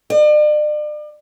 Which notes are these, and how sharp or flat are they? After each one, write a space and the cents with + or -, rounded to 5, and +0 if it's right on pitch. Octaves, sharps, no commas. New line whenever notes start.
D5 +40